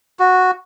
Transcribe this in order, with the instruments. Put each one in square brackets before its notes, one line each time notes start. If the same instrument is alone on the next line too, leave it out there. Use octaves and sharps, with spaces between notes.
[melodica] F#4